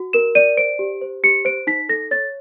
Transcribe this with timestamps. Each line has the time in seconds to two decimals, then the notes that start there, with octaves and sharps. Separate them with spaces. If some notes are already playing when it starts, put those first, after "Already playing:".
Already playing: F#4
0.13 A#4 E7
0.35 D5 D#7
0.57 C5 D7
0.79 G4
1.01 C5
1.24 G4 C#7
1.45 C5 D7
1.67 D#4 B6
1.89 A4 A#6
2.11 C#5 A6